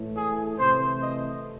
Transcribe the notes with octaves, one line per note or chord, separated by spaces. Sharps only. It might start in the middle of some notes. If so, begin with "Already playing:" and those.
Already playing: A2 E3 A3
G#4
C3 E3 A3 C5
D#5